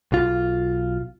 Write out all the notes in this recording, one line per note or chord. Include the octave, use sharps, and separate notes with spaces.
B1 F4